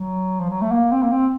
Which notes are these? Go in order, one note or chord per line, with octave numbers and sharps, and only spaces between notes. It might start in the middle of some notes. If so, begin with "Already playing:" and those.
Already playing: F#3
F3
F#3
A3
A#3
C4
A#3
C4